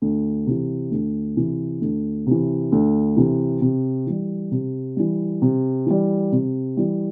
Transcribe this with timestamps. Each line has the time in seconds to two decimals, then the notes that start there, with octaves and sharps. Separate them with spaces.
0.02 D2
0.47 C3 E3
0.91 D2
1.37 C3 E3
1.81 D2
2.26 C3 E3
2.72 D2
3.16 C3 E3
3.61 C3
4.07 E3 G3
4.51 C3
4.97 E3 G3
5.42 C3
5.86 E3 G3
6.32 C3
6.77 E3 G3